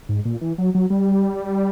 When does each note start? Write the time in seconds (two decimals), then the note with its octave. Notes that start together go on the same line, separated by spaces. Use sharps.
0.09 G#2
0.25 A#2
0.41 E3
0.58 F#3
0.75 F#3
0.90 G3